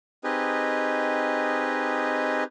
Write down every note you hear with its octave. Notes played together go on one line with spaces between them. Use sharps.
C4 D#4 G4 G#4 B4 D#5